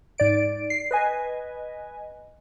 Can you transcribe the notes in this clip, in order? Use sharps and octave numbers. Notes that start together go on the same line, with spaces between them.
G#2 D5 D7
C7
B4 D#5 G#5